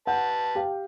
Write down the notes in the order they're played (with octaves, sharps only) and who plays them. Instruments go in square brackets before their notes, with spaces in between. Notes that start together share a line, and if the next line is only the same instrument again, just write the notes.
[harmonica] B4 A5 [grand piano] F#5 G6
[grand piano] G4 F5 G5